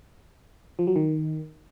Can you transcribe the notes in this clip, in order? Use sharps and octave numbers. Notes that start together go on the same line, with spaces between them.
F3
F#3
D#3